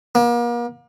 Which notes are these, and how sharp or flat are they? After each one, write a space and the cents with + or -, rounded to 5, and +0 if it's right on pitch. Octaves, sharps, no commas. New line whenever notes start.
A#3 +40